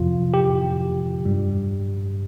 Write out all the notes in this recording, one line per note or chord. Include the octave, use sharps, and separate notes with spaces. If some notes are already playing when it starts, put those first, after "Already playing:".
Already playing: F2 C3 F3 F4
G4
G2 G3